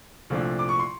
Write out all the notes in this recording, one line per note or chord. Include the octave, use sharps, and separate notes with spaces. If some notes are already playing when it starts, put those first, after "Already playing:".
C2 A#2 F3 A3 D4
D6
C#6
C6